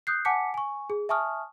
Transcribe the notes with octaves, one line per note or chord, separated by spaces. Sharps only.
D#6 F#6 G6 C7
F#5 G#5 A5 D6 B6 C#7
G#5 C#6
G#4
E5 G#5 A5 C#6 D#6 F6